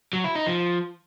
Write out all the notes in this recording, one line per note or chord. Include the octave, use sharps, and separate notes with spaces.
F#3
E4
D#4
F3